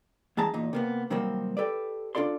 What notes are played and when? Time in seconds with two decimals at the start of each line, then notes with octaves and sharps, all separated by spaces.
0.37 G2 E3 G#3 A5 A#5
0.54 E2 A#2 D#4
0.73 C3 A#3 B3
1.10 C3 D#3 F#3 G3 A#3 C4
1.57 G4 A4 B4 D5
2.15 D4 F4 A4 D5 C6